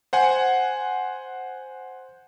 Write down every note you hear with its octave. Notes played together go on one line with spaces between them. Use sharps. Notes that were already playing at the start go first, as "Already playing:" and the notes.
C5 F#5 G#5